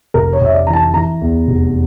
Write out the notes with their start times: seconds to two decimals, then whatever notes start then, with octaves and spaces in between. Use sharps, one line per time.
0.14 F1 A#4
0.33 C#5
0.41 F1 E5
0.54 D5
0.67 E3 A#5
0.73 A5
0.94 E3 A#5
1.21 E2
1.47 F1